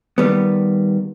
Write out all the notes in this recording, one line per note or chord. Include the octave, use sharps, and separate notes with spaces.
D#3 G3 B3